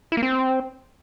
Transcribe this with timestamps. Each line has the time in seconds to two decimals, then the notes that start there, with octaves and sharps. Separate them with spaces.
0.12 E4
0.17 A#3
0.23 C4